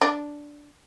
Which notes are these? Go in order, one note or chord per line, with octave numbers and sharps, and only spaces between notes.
D4